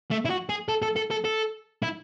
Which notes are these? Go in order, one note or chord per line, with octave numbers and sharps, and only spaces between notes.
A3
E4
F#4
G#4
A4
A4
A4
A4
A4
E4